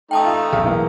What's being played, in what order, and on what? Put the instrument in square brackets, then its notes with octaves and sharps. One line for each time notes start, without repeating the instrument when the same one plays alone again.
[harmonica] A3 D#4 [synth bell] G5 A5 D#6
[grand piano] F4
[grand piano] B1 [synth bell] G#4
[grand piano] E3 A#3